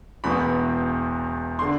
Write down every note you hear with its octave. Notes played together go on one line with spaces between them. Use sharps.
E1 E2 B2 B5
D3 C6